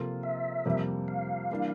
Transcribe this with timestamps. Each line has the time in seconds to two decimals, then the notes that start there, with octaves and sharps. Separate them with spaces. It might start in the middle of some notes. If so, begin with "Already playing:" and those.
Already playing: C3 F3 A#3 F4 A4
0.23 E5
0.66 F2 C3 G3 A#3
1.08 F5
1.51 E3 G3 A#3 D4